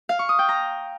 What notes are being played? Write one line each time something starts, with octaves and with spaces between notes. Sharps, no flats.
F5
C#6
D#6
G5
A#5